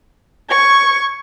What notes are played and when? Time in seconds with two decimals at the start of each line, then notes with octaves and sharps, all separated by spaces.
0.50 C#6 G#6